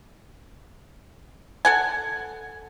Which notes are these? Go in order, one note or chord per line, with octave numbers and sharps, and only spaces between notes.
A4 F#5 G#5